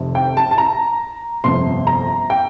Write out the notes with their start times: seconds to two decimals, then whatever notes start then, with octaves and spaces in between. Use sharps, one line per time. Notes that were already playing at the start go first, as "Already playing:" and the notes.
Already playing: F1 F2 C3 D#3
0.15 G5
0.37 A5
0.51 A5
0.58 A#5
1.44 G1 F2 C3 C6
1.87 A#5
2.30 G5